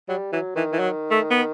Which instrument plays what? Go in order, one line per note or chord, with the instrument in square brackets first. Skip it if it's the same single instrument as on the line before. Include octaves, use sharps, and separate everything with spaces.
[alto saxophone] F#3 [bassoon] G3
[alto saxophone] E3 [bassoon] F#3
[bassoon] D#3 [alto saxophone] E3
[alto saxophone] E3
F#3
A3
B3